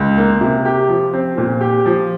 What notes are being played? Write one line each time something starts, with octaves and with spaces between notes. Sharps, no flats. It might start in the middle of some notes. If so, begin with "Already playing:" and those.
Already playing: C#2
A#3
C3
G4
F3
C4
A#2
G4
F3